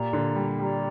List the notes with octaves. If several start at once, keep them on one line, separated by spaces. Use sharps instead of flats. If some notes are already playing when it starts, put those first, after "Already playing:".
Already playing: A#2 G4 D5 A#5
A#2 D3
G3
G3 G4 D5 A#5